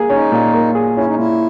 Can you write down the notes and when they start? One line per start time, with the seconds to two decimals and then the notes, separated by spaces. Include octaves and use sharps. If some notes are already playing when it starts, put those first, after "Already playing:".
Already playing: A#3 G#4
0.10 C#4 D#4
0.32 A#2
0.53 A#3
0.75 G#4
0.96 C#4 E4
1.06 D#4
1.15 A#2 E4